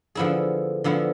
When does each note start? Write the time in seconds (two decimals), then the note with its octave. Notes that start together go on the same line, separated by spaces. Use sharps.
0.15 D3 F3 B3 E4 G#4
0.84 D3 F3 B3 E4 G#4